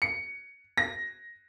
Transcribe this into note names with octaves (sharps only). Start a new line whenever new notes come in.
C#7
A#6